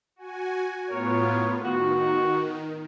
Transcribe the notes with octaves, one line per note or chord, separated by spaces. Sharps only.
F#4 G#5
A2 B3 F4 A#4 C#5
D#3 F#4